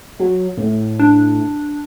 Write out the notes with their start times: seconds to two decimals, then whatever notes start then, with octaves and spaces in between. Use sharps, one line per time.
0.19 F#3
0.57 A2
1.00 D4